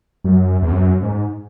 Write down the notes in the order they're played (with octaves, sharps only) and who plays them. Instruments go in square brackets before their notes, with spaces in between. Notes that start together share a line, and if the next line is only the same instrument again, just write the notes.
[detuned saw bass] F#2
E2
F#2
G#2